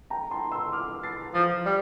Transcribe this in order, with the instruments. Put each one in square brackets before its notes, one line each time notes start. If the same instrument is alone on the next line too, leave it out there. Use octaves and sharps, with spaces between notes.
[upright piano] G5 A#5
A5 C6
C6 E6
D6 F6
A6 C7
[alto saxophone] F3 [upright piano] F6 A6
[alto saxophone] G3